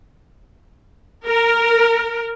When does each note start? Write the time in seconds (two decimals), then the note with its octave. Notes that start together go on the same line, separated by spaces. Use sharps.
1.27 A#4